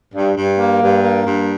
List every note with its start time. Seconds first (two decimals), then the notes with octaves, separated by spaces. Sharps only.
0.15 G2
0.37 G2
0.59 A#3
0.82 G2
1.03 A#3
1.26 G2